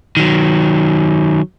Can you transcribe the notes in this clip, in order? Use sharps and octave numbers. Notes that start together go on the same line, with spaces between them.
D#3 F#3